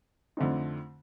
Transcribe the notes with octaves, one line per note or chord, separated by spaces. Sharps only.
F2 D3 A3 C4 D#4